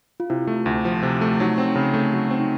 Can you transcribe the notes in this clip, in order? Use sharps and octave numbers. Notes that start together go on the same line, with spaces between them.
F4
C3 E4
A3
D2
F3
C3
A3
F#3 D#4
C4
C#3
A3
F#3
C4
D#4